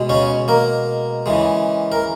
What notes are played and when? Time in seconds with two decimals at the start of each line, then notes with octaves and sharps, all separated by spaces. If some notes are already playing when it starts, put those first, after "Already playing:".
Already playing: B2 G#3
0.09 C#3 C#4
0.48 A#3 A#4
1.26 C#3 E3 G#3
1.92 A#4